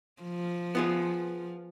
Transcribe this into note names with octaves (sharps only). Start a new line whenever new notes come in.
F3
B3 F4 G#4